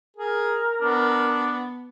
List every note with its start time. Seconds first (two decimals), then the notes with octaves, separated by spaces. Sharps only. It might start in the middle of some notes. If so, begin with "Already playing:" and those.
0.16 G#4 A#4
0.81 B3 D4